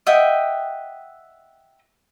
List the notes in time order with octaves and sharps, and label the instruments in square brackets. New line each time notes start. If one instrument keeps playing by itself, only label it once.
[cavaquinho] D#5 E5 F#5 G5